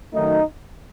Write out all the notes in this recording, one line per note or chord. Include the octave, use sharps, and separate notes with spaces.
F#2 D#3 F#3 A3 D#4